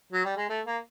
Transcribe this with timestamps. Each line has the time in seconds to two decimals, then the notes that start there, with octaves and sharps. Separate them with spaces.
0.13 F#3
0.25 G3
0.37 G#3
0.49 A3
0.66 A#3